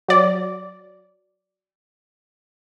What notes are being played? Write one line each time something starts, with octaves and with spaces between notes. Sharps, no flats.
F#3 D5